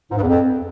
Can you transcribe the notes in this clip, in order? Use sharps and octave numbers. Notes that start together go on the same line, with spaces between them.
G#2
G2
E2
F2